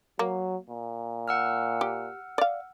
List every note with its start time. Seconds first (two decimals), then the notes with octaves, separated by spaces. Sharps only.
0.19 F#3 A#3
0.70 A#2
1.28 F#5 E6 F6
1.81 G4
2.38 D5 F5